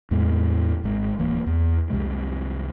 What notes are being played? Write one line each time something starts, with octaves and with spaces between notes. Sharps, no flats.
E2 A2 G#3
G#1 G#3
D1 E3 A#3
E2
C2 F2 C3 G#3